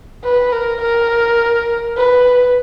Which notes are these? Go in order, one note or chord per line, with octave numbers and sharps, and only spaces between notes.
B4
A#4
A#4
B4